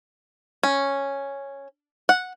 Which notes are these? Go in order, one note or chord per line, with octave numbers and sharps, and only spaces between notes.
C#4
F#5